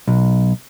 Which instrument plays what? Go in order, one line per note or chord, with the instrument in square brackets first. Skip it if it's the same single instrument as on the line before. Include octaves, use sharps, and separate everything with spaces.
[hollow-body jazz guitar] B1